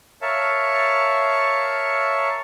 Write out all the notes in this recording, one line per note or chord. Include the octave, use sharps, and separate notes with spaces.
A#4 C#5 E5 F5 A5